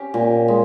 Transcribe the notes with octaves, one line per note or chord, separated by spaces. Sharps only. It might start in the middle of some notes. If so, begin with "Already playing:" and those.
Already playing: C#4 G4
A#2
G#3